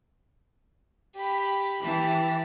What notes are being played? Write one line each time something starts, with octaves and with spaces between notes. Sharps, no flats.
G4 B5
E3 G4 A5